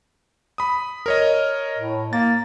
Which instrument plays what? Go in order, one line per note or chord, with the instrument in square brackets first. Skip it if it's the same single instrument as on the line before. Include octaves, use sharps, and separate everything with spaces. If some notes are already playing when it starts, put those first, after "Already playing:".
[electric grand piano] B5 D#6
A#4 C#5 D#5
[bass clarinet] A2
[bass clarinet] A#3 [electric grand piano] A6